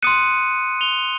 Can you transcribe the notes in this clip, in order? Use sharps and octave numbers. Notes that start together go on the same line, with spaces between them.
C6 D#6 F#6 C#7 D#7
F7 G7